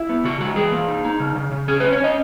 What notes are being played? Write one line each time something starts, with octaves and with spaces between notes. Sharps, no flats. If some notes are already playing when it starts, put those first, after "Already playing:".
Already playing: E4
B3
C#3 F#4
G#3 F#4
E3 G#4
A#3
D#4
D#4
C#3
C#3
C#3
C#4 G#4
C#4 B4
C#5
C#4 D#5